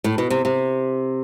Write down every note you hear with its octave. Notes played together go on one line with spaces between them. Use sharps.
A2
B2
C3
C3